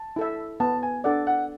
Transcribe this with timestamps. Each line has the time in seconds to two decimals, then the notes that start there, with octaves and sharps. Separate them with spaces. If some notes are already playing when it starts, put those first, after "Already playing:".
Already playing: A5
0.16 E4 A4 E5
0.60 B3 A5
0.83 G#5
1.04 D4 A4 D5 F#5
1.27 F#5